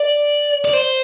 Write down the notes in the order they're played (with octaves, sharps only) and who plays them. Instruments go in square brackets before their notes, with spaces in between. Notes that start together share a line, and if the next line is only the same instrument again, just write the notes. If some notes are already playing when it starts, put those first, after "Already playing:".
Already playing: [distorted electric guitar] D5
D5
C5